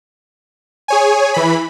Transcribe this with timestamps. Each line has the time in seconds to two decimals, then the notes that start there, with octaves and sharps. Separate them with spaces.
0.88 G#4 C#5 G#5
1.34 E3 B5